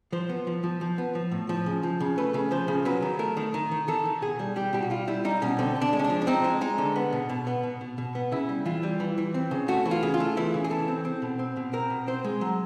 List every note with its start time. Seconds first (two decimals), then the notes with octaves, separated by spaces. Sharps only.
0.12 F3 C5
0.29 B3
0.47 F3
0.64 F3
0.81 F3
0.98 B3
1.15 F3
1.32 A2
1.49 F3
1.66 C#3
1.83 F3
2.00 C#3
2.18 A3 B4
2.34 C#3
2.51 F3 C5
2.68 C#3
2.85 F#3 B4
3.02 D#3
3.19 A3 A#4
3.37 D#3
3.54 D#3
3.71 D#3
3.88 D#3 A4
4.05 D#3
4.22 B2 G#4
4.39 G3
4.56 G3 G4
4.73 B2 G4
4.82 F#4
4.90 G3 F4
5.08 G3 E4
5.25 G3 D#4
5.42 B2 C#4
5.59 D3 C4
5.76 D3
5.81 D4
5.93 G#3
5.99 C#4
6.04 D4
6.10 F3
6.22 D4
6.27 C4 D#4
6.44 G#3
6.61 G#3 D#4
6.78 D3
6.95 B3
7.13 B2
7.29 B2
7.47 B3
7.63 B2
7.81 B2
7.98 B2
8.15 B3
8.32 C#3 E4
8.49 G3
8.66 E3 F4
8.83 G3
9.00 E3
9.18 E3
9.34 C4
9.51 C#3
9.68 A3 F#4
9.86 E3
9.91 F4
10.03 C#3
10.14 F4
10.20 A3
10.37 E3 E4
10.54 C#3
10.64 G#4
10.71 E3 A4
10.88 C4
11.05 C4
11.22 B2
11.39 C4
11.57 B2
11.73 C4 A#4
11.90 B2
12.07 C4 C5
12.24 G#3
12.41 F#3